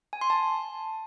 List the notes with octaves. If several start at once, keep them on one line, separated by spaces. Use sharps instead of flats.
G#5
C6
A5